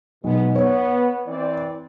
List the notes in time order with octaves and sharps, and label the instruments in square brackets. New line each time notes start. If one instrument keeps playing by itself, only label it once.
[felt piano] B1 [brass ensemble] B2 G#3 B3
[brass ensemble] B3 [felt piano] C#5
[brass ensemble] E3 C4 D5